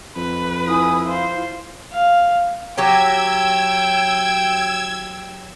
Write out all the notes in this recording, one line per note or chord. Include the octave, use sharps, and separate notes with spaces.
F2 B4
E4 G#5 D#6
F4 C5
F5
F#3 G4 C#5 G5 E6 G#6